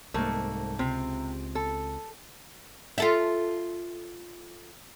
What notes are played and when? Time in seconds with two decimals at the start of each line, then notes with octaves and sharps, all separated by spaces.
0.14 C2 G#2 A3 A#3
0.79 C#2 C3 C4
1.55 A4
2.98 F4 A4 E5